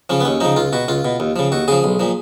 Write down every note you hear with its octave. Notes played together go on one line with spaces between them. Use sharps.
C#3 F3 C#4
B3
D#2 C#4
C#3 F3 D#4
C#2 F4
B2 F#4
C#2 F4
B2
D#2
C#3 F3
D#2 F#4
C#3 F3 G#4
B1
A#2 F3